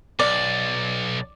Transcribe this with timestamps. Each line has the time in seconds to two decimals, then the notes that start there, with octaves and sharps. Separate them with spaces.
0.19 B1 D5